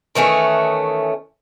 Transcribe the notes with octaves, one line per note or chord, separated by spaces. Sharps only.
D#3 E3 A3 C#4